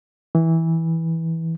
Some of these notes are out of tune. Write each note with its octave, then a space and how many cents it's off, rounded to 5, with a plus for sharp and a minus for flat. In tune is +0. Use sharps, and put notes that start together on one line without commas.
E3 -15